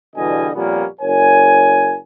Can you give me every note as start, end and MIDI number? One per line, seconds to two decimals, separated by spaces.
0.15 0.48 40
0.15 0.48 47
0.15 0.48 50
0.15 0.48 55
0.15 0.48 75
0.15 0.48 80
0.54 0.85 41
0.54 0.85 46
0.54 0.85 55
0.54 0.85 58
0.54 0.85 59
0.54 0.85 61
1.01 1.96 30
1.01 1.96 70
1.01 1.96 73
1.01 1.96 80